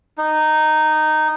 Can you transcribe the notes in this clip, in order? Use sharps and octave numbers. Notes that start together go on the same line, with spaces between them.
D#4